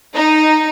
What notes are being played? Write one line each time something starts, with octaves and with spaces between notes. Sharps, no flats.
D#4